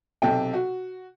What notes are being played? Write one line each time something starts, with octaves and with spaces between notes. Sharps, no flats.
B1 C3 A4 G5
F#4